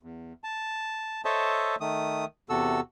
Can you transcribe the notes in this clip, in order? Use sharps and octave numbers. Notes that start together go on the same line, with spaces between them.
E2
A5
A4 C5 C#5 D#5 E5 A5
D#3 A3 D#6
E2 C3 F#4 A4 E6